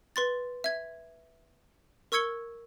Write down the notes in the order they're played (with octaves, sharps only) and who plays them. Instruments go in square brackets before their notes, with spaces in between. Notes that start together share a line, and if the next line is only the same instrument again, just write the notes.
[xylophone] B4 C6 A6
E5 G#6
A#4 C#6 E6 G#6 C#7 G7